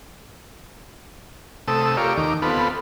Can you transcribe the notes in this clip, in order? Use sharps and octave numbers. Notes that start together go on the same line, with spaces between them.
C3 A3 A4 D#6 E6
F4 G4 A#4 C#5 D5
D#2 D#3 D6
B3 C4 F4 A4 B4